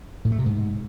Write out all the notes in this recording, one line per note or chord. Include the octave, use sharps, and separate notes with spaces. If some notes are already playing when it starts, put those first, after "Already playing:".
A2
A3
C3
G#2